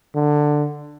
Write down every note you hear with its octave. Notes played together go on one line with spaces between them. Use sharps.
D3